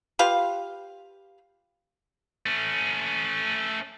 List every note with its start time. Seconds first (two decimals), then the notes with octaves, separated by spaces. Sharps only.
0.19 F4 G4 B4 F5
2.46 A3 C#4